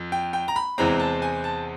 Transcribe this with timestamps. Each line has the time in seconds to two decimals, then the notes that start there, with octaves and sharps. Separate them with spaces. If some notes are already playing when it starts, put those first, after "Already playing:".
Already playing: F2
0.12 G5
0.33 G5
0.48 A#5
0.56 B5
0.78 E2 C3 E3 G#3 C4 A#5
1.00 A5
1.22 G#5
1.44 A5